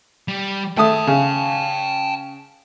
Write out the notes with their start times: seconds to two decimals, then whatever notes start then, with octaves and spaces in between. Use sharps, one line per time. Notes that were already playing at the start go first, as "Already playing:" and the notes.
0.28 G3
0.77 A3 G5 A5 D#6
1.07 C#3